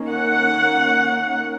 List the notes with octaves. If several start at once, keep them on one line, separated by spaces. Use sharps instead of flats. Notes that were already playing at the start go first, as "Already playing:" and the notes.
Already playing: D#3 A#3 C#4
F#5